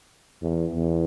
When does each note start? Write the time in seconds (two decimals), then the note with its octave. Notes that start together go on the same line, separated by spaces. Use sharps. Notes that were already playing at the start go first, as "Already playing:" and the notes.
0.42 E2
0.75 E2